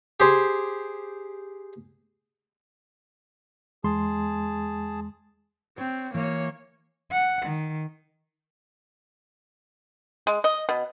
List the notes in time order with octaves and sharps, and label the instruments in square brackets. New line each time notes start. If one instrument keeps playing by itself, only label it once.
[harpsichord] G4 G#4 C5
[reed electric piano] E2 G#3 C6 [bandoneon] G#4 A5
[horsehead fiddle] C4 [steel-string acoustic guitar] C#5
[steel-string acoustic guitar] E3 [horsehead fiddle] A#3 C#5
[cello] F#5
D#3
[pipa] G#3
D#5
B2